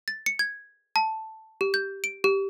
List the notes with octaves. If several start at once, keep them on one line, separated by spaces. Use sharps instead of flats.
A6
C#7
G#6
A5
G4
G6
D7
G4